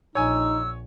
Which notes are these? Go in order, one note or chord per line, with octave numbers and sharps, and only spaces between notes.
A#1 D#4 C#5 G#5 E6